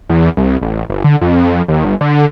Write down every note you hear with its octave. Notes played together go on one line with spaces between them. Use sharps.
E2
C2
A1
G1
D3
F2
D#2
G1
D3